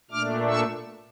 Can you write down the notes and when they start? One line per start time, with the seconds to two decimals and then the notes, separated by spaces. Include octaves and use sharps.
0.11 A#2 A3 D4 D6 F6
0.48 C#6 E6